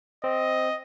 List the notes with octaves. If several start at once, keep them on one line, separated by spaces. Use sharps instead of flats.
C4 D#5